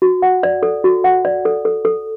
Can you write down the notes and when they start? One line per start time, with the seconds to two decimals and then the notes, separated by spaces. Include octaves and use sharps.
0.02 F#4
0.22 F#5
0.43 D5
0.63 A4
0.84 F#4
1.04 F#5
1.25 D5
1.45 A4
1.65 A4
1.85 A4